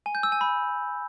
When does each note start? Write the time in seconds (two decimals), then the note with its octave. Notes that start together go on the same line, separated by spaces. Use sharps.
0.06 G#5
0.15 G6
0.23 E6
0.32 G#5
0.41 B5